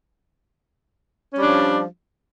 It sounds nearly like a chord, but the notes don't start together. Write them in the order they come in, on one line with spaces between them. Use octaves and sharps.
C#4 G3 D4 F3